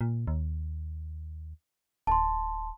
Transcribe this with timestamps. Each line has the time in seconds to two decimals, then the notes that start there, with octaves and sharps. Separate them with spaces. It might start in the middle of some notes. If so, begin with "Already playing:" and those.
0.01 A#2
0.27 D#2
2.07 D1 A5 C6